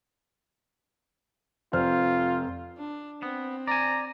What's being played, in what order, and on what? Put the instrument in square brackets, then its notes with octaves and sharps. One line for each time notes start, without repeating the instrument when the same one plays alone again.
[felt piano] F1 C5 F6 [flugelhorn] F4
[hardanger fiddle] D4
[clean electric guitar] B3 [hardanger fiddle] C4
[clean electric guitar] D5 G#5 [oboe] A#5